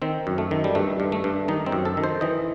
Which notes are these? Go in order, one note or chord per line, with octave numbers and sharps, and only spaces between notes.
D#3 C4
F#2
A3
D#3
G3
G2 A3
G2
A3
G2
D#3 D#4
C4
F#2
A4
D#3
C5
E3 D#5